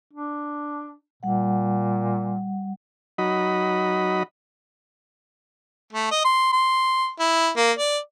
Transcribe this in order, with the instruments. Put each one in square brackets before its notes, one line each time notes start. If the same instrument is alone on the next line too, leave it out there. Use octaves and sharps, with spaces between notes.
[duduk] D4
[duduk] A#2 [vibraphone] G3 F#5
[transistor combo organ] F#3 D#4 F#4 D#5 B5
[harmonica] A3
D#5
C6
C6
E4
A#3
D5